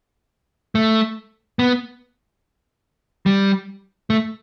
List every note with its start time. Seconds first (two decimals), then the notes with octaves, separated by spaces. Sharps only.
0.75 A3
1.59 B3
3.26 G3
4.10 A3